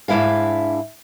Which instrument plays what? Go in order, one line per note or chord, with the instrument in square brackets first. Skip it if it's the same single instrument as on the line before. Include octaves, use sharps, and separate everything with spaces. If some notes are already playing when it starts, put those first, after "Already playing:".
[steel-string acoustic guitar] G#2 D4 E4 E5 F5